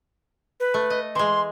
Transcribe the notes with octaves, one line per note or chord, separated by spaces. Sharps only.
B4
A3
D#5
E3 G#3 C6